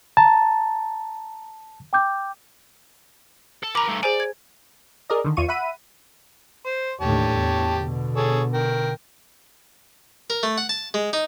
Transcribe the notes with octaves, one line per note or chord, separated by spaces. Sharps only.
A5 A#5
G5 D6 G6
A4
A#4 A#5 B5 D6
G2 A3
G#4 C5 D5 G#5
G#6
G#4 A#4 D5 D#5
D3 D#3
E2 F4 C#6 D#7
E5 F#5 B5 D#7
C5
D#2 A2 D3 G4 C#5 A5
E2
B2 D3
G#4 A4 C#5
A#4 G5
A#4
A3
F#5
A5
G#3
D#4